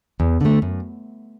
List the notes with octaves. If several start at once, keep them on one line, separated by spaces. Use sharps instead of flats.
E2
D3 A3
F#2